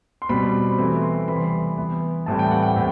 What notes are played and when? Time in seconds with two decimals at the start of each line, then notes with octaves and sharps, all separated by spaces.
0.22 C6
0.29 B2 G3 C4 B5
0.78 E3 A3 C4
1.03 C6
1.28 C3 E3 G3 B3 B5
1.36 C6
1.44 B5
1.78 E3 B3
2.26 A2 E3 G3 C4 A5
2.39 G5
2.51 F#5
2.62 G5
2.76 A2